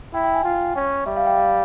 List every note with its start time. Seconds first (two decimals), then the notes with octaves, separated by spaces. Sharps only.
0.14 E4 G5
0.24 G5
0.34 G#5
0.44 F4
0.76 C#4
1.06 G3 E5
1.17 F5
1.27 G5
1.37 F5